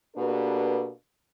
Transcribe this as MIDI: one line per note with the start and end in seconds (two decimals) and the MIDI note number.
0.15 0.88 47
0.15 0.88 58
0.15 0.88 62
0.15 0.88 67
0.15 0.88 69
0.15 0.88 71